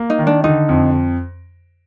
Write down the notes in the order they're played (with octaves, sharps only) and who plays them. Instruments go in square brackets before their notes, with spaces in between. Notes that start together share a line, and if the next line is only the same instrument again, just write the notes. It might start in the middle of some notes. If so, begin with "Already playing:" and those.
Already playing: [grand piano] A#3
[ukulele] D#4
[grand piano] D#3
[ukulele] D4
[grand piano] D3 [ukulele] D#4
[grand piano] F2